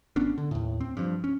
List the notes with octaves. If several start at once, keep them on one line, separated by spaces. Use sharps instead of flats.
G#1 B3 C#4 D4
D3
D#2 A2
C4
G2 F3
C#4